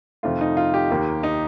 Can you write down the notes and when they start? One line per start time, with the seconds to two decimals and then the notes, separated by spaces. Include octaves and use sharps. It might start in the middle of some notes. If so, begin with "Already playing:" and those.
0.23 F2 C3 D#3 A3 F4
0.41 D#4
0.57 F4
0.74 G4
0.91 D#2 D#3 A#3
1.23 D#4